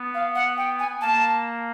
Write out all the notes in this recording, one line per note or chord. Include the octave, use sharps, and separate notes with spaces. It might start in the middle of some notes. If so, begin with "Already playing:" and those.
Already playing: B3
F5
F#5
G5
G#5
A#3 A5